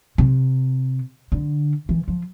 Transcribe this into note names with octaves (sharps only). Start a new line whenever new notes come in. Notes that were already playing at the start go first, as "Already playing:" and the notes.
C3
D3
E3
F3